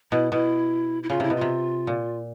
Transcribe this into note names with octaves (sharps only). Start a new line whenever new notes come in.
B2 E4
B2 E4
E4
C#3 F4
C3 E4
B2
C3 F4
A#2